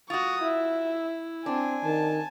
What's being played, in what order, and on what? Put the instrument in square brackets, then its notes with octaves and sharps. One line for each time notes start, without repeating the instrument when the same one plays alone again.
[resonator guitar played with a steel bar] F4 F#4 [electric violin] C#6 D#6
[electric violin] E4 [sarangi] E5
[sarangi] C4 [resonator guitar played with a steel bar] D4 [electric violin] G#5
[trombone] D#3 [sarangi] A5